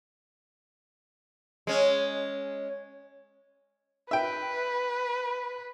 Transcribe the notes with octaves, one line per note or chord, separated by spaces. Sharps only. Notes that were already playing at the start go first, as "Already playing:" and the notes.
G#3 C#4
B4 E5 G5